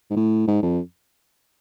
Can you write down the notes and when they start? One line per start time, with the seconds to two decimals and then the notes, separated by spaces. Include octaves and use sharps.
0.10 G#2
0.16 A2
0.48 G#2
0.63 F2